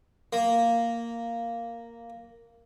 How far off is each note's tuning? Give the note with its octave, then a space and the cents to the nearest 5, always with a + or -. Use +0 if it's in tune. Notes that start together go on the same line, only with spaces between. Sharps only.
A#3 -5